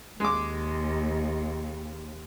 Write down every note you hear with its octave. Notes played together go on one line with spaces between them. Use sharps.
D#2 G#3 D6